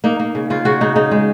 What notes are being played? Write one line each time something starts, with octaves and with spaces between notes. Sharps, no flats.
A#3 D#4
A#3
C#3
C#3 F4
C#3 F#4
C#3 D#4
C#3 D#4
G#3